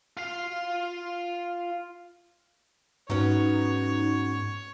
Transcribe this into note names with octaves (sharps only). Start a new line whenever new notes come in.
F4 F5
G#2 F#3 B3 C#4 D#4 C#5